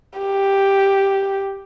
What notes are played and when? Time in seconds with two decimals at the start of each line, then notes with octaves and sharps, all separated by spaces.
0.19 G4